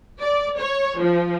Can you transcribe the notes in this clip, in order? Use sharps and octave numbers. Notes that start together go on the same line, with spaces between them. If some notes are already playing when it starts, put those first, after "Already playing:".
D5
C#5
F3